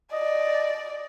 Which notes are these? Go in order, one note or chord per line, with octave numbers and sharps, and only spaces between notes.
D5 D#5